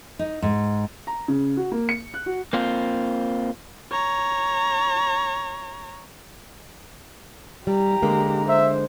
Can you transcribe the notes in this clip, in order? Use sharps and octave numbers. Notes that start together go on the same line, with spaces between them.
D#4
G#2
A#5
C#3
F#4
A#3
C#7
F#6
F#4
A#3 C4 F4
C#5 A#5
G3 G4 A#5
D3 G#3 A#3
C5 E5